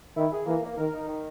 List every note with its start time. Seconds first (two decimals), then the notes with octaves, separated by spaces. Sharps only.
0.17 D#3 E4
0.32 G#4
0.46 E3 A#3
0.63 A#3
0.77 D#3 A#4
0.93 D#4
1.08 D#3